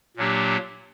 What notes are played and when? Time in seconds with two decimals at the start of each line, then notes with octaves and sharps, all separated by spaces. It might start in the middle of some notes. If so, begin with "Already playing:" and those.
0.16 A#2 F#3 A#3 D4 G4